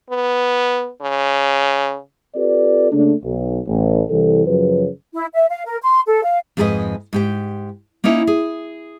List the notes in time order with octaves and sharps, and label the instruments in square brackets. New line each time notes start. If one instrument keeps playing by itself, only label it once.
[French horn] B3
C#3
[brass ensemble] C4 F4 G4 A4 B4 D5
C#3 A3 A#3 D4
B1
A1
C2 E3 A4
F#2 C#3 F3 F#3 B4
[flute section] E4
E5
F5
A#4
C6
A4
F5
[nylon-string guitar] F2 G#2 G#4 A4 B4 D#5
G#2 G4 G5
A#3 C#4 D#4 E4 C#5
G#4